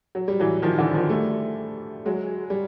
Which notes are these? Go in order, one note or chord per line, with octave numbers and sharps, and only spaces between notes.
F#3
G3
E3 F#3
D#3 F3
D3 E3
D#3 F3
G3 A3
F#3 G#3
G3